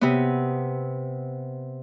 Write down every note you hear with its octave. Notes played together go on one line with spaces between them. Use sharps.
C3 B3